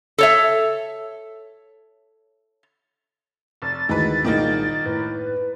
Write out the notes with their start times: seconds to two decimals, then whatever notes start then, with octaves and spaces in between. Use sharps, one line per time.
0.18 A4 C#5 E5
3.62 F1 A6
3.89 D2 D#3 E3 G#3 B4
4.24 C2 A#2 D#3 G#3 A#3 D#4
4.86 A2 B4